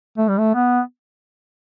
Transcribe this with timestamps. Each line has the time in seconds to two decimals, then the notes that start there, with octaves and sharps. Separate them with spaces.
0.18 A3
0.29 G3
0.38 A3
0.55 B3